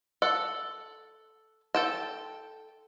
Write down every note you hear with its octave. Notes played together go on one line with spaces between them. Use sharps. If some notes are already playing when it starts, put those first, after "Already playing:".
A4 F#5
A4 G5 A5